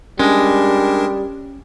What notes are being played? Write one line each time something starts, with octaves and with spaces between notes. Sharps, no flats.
G3 G#3 C#4 D4 A#4